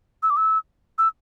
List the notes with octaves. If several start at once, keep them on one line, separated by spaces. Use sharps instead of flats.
E6
D6
E6
E6